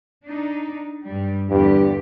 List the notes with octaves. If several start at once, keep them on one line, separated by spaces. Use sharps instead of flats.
D4 D#4
G2 G3
E2 G2 D3 G4